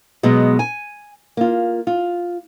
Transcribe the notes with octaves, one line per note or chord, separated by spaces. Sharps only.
B2 F#3 G#3 B3
G#5
A#3 F4
F4